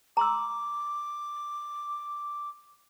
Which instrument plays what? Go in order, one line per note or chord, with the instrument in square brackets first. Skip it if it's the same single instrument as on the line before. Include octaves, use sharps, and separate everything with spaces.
[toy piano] A#5 C6 E6 [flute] D6